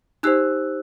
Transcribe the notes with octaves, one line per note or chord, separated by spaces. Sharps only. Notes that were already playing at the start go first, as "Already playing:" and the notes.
D#4 G4 C5 E6 F#6